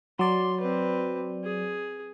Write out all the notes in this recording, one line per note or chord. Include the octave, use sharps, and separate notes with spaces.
F#3 D5 C6
C4 B4
G#4